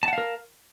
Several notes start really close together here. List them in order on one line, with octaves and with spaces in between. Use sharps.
A5 F#5 F5 A#4